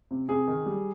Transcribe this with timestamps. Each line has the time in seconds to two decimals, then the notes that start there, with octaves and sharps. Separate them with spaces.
0.11 C3
0.28 C3 G#4
0.47 D#3
0.66 G3